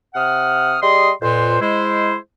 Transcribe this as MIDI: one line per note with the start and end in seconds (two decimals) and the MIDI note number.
0.15 0.77 48
0.15 0.77 78
0.15 0.77 87
0.15 0.77 89
0.81 1.10 55
0.81 1.10 68
0.81 1.10 75
0.81 1.10 84
1.22 1.59 41
1.22 1.59 46
1.22 1.59 71
1.22 1.59 72
1.61 2.14 56
1.61 2.14 64
1.61 2.14 72